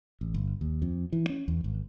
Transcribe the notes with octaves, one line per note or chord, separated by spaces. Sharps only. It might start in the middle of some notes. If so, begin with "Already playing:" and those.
A1
G1
D#2
F2
E3
C#4
E2
G#1